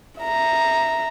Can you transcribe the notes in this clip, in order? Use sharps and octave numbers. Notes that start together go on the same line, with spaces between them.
E5 A#5